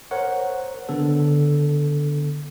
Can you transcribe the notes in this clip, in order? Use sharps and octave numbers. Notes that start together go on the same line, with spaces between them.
A#4 C5 C#5 F#5
D3 B3 A4